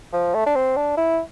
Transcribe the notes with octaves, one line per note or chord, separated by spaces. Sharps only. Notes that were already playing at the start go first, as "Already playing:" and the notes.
F3
A3
D4
C4
D4
E4